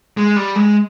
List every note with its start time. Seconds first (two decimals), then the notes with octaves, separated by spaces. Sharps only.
0.17 G#3
0.36 G3
0.56 G#3